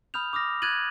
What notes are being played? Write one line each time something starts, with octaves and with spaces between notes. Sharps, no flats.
B5 D#6 F6 G6 F7
D6 D#6 F6 A#6
F#6 G#6 A6 D#7 F#7